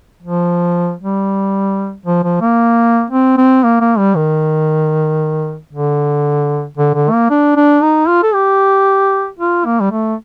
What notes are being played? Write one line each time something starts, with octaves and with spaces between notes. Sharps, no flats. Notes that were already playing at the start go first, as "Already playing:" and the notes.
F3
G3
F3
F3
A#3
C4
C4
A#3
A#3
G3
D#3
D3
D3
D3
A#3
D4
D4
D#4
F4
A4
G4
F4
A#3
G3
A3